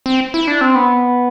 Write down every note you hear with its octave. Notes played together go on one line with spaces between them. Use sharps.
C4
E4
D4
C4
B3